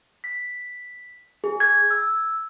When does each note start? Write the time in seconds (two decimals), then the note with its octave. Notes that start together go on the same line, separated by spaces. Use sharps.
0.24 B6
1.44 G#4
1.60 G#6
1.91 E6